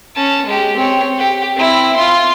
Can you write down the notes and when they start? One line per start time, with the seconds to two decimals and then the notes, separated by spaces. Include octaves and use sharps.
0.15 C#4 A5
0.46 G#3 G4
0.76 C4 C#5
1.18 G4
1.56 C4 E4
1.96 F4 C6